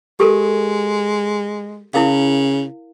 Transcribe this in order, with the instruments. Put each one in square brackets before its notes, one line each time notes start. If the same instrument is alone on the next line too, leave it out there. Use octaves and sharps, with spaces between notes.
[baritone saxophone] G#3 [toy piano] G4 A4 A#4
[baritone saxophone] C#3 [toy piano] E4 A#4 F5